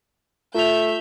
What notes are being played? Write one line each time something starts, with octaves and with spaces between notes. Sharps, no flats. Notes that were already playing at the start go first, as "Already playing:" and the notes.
A3 F4 E5 G6 F7